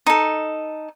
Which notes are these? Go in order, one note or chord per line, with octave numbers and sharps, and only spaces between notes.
D#4 A4